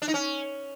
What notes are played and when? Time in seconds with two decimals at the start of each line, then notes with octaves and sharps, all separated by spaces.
0.02 D4
0.08 D#4
0.14 C#4